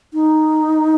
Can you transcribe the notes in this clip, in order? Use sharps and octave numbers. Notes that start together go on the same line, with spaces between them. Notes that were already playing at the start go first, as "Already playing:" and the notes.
D#4